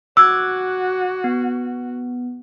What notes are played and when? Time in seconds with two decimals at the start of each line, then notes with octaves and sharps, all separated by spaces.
0.17 F#4 D6 E6 F#6 G#6
1.24 B3